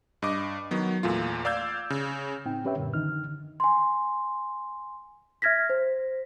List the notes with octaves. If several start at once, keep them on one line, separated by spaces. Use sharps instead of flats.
G2 D#5 D6
D#3 F#3 B3
E2 A#2 A3 F4
D5 F5 D6 E6 G6 G#6
C#3
A2 C4 D#4 G5
C#4 G4 B4 C#5 E5 G5
F#2 A#2 D3 A#4
D3 D#3 D#4 F6
G#5 C6
E5 F6 G#6 A#6 B6
C5